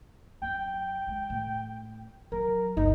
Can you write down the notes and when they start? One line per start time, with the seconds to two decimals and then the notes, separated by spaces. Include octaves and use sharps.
0.42 F#2 G5
1.07 G#3
1.30 A2
2.32 F#3 A#4
2.77 G1 C#2 D#4